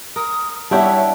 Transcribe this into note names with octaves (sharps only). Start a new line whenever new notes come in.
A#4 D#6
G3 D4 E4 G4 C#5 E5 F#5 A5